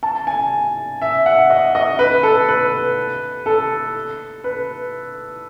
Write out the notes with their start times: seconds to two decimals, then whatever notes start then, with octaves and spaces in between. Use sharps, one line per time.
0.03 A5
0.27 G#5
1.02 E5
1.26 F#5
1.50 D#5
1.75 D#5
1.99 B4
2.23 A4
2.49 B4
3.46 A4
4.44 B4